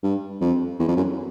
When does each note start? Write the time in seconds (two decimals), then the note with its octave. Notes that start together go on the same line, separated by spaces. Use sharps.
0.03 G2
0.41 F2
0.79 E2
0.88 F2
0.97 F#2